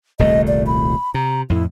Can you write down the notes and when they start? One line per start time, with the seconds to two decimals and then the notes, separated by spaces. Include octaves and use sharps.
0.19 D#1 C2 A3 D#5
0.47 D5
0.66 B5
1.14 C3 A#5
1.50 F2 A2 E4